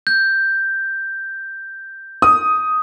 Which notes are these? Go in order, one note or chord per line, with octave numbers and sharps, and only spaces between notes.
G6
D#6